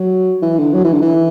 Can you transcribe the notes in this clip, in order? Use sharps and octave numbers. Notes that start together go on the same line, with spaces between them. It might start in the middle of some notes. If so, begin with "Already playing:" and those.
Already playing: F#3
E3
D3
F#3
E3
D3
E3